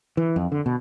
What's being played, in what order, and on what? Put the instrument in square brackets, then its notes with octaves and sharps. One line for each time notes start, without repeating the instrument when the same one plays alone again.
[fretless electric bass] E3
F2
D3
B2